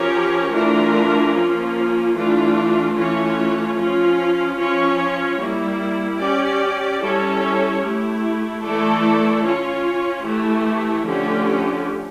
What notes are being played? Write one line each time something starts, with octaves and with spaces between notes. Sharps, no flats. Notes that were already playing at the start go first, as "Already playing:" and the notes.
Already playing: F3 C#4 G4 A#4 C#5
E3 A3 D4 F4 A#4
F3 A#3 C#4 F4
E3 A3 D4 F4
E3 A3 C#4 F4 C#5
F3 C#4 F4
F3 C#4 F4 C#5
G3 A#3 E4
C#4 G4 D5
G3 C#4 E4 A4 C#5
A3 E4 G4
E3 A3 E4 A4 D5
C#4 F4 C#5
E3 A3 E4 G4
D3 F3 A3 C#4 G4